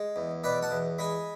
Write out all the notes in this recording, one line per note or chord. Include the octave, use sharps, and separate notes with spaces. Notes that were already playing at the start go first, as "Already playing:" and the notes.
Already playing: G#3
E2
B2 B4 D5
F#5 A5
E2
G#3 G#5 B5